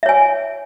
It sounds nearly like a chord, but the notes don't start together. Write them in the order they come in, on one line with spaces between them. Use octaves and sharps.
E5 C#5 G#5